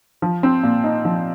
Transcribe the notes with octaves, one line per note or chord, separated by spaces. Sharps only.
F3
C4
A#2
D#4
F3